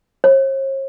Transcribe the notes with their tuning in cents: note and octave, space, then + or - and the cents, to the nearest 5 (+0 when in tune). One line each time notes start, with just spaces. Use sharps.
C#5 -45